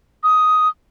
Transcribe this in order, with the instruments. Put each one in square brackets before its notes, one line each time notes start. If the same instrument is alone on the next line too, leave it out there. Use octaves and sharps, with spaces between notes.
[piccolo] D#6